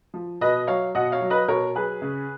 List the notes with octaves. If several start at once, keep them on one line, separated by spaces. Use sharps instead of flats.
F3
B2 B4 D#5
F#3 C#5 F5
B2 D#5 F#5
C#5 F5
F#3
B4 D#5
B2 A#4 C#5
F#3 G#4 B4
C#3